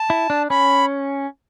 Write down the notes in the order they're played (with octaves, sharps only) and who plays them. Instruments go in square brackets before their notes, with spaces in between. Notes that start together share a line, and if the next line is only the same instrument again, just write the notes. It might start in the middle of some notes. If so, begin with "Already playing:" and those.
Already playing: [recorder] A5
[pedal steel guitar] E4
D4
[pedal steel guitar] C#4 [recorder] B5